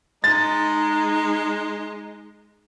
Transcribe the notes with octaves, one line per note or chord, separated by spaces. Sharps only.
G#3 D#4 A6